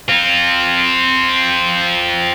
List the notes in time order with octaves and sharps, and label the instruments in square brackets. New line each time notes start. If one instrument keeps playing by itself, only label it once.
[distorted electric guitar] C4 F4